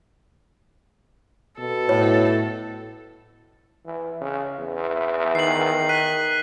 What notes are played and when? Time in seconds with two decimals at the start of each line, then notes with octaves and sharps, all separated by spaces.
1.59 B2 A4
1.89 A2 C#5
3.85 E3
4.21 C#3
4.59 E2
5.35 D#3 C7 F#7
5.89 F#6 B6 D#7